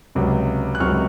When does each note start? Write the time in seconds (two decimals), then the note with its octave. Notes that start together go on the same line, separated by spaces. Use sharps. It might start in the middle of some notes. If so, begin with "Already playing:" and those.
0.15 C#2 C3 F#3
0.75 F#6
0.80 C#2 C3 F#3 C#6 F6